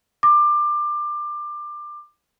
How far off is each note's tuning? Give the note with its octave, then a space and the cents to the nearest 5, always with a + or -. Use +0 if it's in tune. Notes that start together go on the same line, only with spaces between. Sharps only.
D6 +20